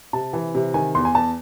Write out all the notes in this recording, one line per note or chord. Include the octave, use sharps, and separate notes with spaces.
C3 A5
E3
C3
D#3 G#5
E2 C6
G#5
E2 A5